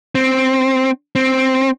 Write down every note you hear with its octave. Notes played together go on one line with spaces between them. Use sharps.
C4
C4